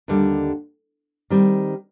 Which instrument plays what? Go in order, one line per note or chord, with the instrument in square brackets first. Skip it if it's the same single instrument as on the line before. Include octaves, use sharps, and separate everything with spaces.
[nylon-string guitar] D#2 D3 G3
D#3 G3 C4